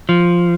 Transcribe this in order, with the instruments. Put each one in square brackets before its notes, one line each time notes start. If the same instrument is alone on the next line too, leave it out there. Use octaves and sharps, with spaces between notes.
[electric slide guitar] F3